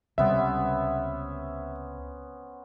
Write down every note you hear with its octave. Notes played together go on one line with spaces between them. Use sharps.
C#2 C3 G3 B3 C#4 C5 E5